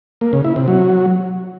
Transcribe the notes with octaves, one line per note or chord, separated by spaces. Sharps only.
A#3
C#3
E4
C3
F#3